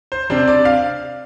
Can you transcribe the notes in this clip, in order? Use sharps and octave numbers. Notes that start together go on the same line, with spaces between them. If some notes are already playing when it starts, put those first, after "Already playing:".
C5
C3 G3 D4 C5
D5
F5